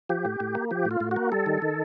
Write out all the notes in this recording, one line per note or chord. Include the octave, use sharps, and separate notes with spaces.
F3 G4
A2
A2
A#3
F3 G4
A2
F4
A2
F#4
A#3
G3 A4
D#3
D#3